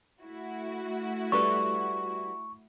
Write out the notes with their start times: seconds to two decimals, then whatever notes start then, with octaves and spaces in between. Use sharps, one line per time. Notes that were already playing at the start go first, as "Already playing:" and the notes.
0.22 A3 E4 F#4
1.32 G3 A4 B4 C#6